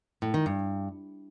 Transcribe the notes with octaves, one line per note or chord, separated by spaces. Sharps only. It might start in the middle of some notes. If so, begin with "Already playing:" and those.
A2
D#3
G2